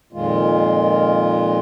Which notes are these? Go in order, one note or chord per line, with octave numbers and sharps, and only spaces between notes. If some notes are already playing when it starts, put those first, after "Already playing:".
F2 A#2 D#3 G#3 F4